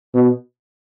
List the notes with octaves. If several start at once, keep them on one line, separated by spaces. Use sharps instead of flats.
B2